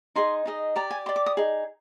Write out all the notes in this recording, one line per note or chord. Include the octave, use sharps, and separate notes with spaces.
D#4 G#4 D#5 C6
D#4 G#4 D#5
G4 D5 A#5
G#5
G4 D5 C6
D6
D#6
D#4 G#4